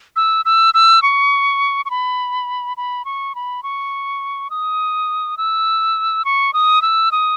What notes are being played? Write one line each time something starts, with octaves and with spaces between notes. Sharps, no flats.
E6
E6
E6
C#6
C#6
B5
B5
C#6
B5
C#6
D#6
E6
C#6
D#6
E6
D#6